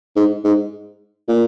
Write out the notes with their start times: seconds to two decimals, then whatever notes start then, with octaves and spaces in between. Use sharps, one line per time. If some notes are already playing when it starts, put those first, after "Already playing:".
0.16 G#2
0.44 G#2
1.28 A#2